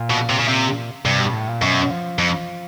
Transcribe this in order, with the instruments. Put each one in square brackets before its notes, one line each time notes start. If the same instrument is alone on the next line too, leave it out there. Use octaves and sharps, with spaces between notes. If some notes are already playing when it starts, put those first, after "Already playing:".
Already playing: [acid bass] A#2
[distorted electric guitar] B2
C3
C#3
C3
[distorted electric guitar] G2 [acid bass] C3
[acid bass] B2
A2
A#2
[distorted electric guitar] F#2 [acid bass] B2
[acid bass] F3
[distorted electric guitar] F2